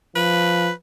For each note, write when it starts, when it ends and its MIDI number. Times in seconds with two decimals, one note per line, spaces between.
0.16 0.71 53
0.16 0.71 71